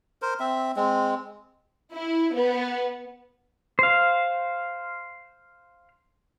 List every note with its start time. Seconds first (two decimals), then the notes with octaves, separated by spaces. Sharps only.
0.22 A#4 C5
0.40 C4 E5
0.76 G#3 C4
1.94 E4
2.35 B3
3.79 C5 F5